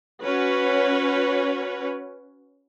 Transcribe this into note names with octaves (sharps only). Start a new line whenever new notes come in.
C#4 F#4 B4 C#5